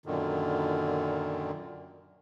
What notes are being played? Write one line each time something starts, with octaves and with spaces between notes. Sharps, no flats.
F#2 A#2 D3 D#3